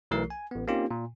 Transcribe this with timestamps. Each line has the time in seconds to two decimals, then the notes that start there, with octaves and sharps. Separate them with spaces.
0.11 B1 E3 A3 A#4 C7
0.30 G#5
0.51 A1 B3
0.68 A#3 C4 C#4 D#4 F4 G4
0.91 A#2